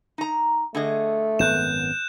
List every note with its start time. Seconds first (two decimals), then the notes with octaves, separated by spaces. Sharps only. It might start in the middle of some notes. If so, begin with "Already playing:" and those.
0.18 D#4 A#5
0.75 D3 A3 G#4 D#5
1.39 G#1 F#2 B3 F#6 G6 E7